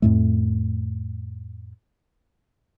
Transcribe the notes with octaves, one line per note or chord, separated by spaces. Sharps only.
F2 A2 A3